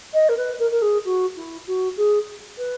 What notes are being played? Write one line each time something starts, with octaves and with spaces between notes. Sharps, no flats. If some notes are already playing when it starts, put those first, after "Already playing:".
D#5
A#4
B4
A#4
A#4
G#4
F#4
E4
F#4
G#4
B4